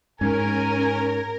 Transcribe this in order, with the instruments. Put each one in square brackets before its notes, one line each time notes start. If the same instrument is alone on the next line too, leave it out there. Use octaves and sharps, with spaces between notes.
[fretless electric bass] G#2 [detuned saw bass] C#4 [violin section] A#4 [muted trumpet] G#5